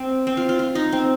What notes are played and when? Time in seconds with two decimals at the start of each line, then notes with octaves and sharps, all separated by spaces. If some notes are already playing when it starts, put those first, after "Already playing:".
Already playing: C4
0.27 C4
0.37 F4
0.49 F4
0.59 F4
0.75 D#4
0.92 C4